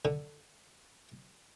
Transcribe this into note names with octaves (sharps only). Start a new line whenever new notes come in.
D3